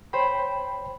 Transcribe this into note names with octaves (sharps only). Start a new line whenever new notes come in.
C5 C#5 G5 B5